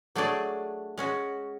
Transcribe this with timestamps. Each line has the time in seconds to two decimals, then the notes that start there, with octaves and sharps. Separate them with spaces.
0.15 F#3 A3 D4 G#4 D5
0.98 G#3 C#4 F#4